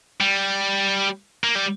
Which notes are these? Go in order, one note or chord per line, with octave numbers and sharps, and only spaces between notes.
G3
A#3
G3